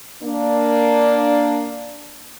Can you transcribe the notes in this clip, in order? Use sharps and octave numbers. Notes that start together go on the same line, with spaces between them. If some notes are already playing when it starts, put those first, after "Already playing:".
A#3 D4